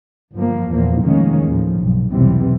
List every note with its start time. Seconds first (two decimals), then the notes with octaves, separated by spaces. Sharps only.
0.34 G1 F#2 F3 A#3
0.70 E2 A#2 F3 A#3
1.03 F1 D#3 G#3 A#3 C#4
1.47 D#2 A2 F3
1.80 B1 G2
2.12 B1 E2 C3 E3 G3